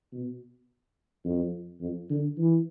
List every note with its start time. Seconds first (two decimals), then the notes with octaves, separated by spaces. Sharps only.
0.13 B2
1.25 F2
1.81 F2
2.10 D3
2.38 E3